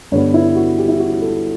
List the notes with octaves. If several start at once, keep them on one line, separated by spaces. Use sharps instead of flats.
G2 D3 G3 B3 C#5
E4
F#4
G4
E4
F#4
A4